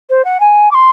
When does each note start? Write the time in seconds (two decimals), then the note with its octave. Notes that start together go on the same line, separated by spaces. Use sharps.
0.10 C5
0.25 F#5
0.40 G#5
0.71 D6
0.74 C6